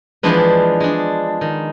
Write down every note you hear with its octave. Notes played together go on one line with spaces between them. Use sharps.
E3 F3 G#3 B3 D4 B4
G#3 D4
D#3